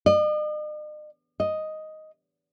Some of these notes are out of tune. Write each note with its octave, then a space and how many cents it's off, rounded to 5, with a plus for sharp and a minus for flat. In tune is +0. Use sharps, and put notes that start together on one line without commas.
D#5 -45
D#5 +5